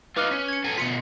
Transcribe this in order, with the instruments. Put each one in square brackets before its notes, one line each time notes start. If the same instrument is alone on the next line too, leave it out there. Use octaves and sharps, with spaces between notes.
[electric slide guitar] D#4 F4 [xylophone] B4 D6 F6
[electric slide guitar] C#4
[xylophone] G#6 C#7
[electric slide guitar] F#3 A4 G#5
[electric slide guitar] B2 F3 F4 [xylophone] B6 C#7